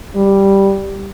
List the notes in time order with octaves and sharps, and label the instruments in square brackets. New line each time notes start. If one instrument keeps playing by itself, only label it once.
[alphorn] G3